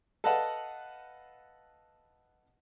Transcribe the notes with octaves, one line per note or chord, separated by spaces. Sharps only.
A4 B4 D#5 F5 F#5 A5